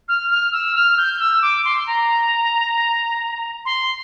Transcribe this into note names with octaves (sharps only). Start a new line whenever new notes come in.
F6
F6
E6
F6
G6
E6
D6
C6
A#5
C6